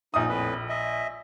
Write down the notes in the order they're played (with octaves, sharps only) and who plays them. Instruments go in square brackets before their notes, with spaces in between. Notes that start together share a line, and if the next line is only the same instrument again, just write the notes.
[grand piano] A#1 D#6 [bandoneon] D#4
[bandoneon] F2 A2 B4
D#5 E5